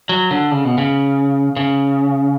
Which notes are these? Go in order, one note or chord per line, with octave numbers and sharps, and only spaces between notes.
F#3
D3
C#3
B2
C#3
C#3